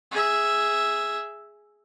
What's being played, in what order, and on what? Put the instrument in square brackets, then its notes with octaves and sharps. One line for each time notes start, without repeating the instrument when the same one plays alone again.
[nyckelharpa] G#4 E5